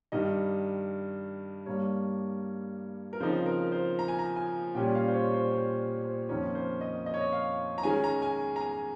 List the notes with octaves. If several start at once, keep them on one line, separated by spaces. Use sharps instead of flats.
G2 D#3 G3 D#5
G2 G3 A#3 C#5
A#4
C#3 F3 C4 D#4 C5
A#4
C5
A#5
G#5
A#5
G#5
A#2 G3 C#4 G5
F5
C5
C#5
C5
C5
C5
F2 D#3 A#3 C#4
C5
D#5
D#5
C#5
D#5
F5
A#5
D#3 G#3 C#4 G#5
A#5
G#5
A#5
G#5